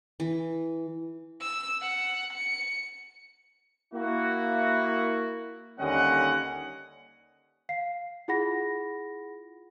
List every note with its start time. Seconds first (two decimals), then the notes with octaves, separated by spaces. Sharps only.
0.20 E3
1.41 E6
1.82 F#5
2.33 C#7
3.94 A#3 E4 F#4
5.80 D#2 D3 G3 C#4 D#5 F#5
7.69 F5 C7
8.28 E4 F4 G#4 F#5 B5 A#6